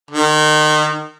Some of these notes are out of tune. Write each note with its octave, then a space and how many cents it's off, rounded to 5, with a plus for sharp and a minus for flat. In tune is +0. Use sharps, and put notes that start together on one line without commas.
D#3 -30